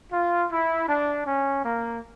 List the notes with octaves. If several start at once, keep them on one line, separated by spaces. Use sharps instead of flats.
F4
E4
D4
C#4
A#3